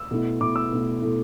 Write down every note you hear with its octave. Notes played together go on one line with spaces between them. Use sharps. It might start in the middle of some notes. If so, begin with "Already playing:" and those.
Already playing: E6
B2 A3 E4
B2 A3 E4 D6
E6
B2 A3 E4
B2 A3 E4